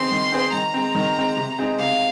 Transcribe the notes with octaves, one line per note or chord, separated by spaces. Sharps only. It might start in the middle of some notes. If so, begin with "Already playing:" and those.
Already playing: D#3 C4 G#4 C5 C6
D#3
C4 G#4 C5
D#3 A#5
G#3 C4
D#3
G#3 C4
C3
G#3 C4 D#4 G#4
C3 F5